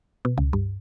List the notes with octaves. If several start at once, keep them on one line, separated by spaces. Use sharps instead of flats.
B2
C#2
G2